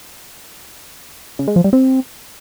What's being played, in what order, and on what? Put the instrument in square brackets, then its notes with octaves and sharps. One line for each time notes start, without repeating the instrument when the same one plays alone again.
[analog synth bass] C#3
G#3
F3
G3
C4